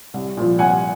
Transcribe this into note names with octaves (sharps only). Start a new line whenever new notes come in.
C2
A#2 F3
C2 F#5 G#5